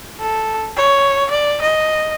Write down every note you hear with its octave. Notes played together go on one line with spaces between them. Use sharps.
A4
C#5
D5
D#5